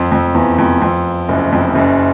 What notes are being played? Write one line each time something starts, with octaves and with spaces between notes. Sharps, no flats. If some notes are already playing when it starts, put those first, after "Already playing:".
Already playing: F2
F2
E2
F2
F2
F#1 F#2
F2
F#1 F#2